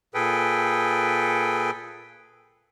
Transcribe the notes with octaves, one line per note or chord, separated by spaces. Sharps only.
A#2 G#4 A4 B4 G5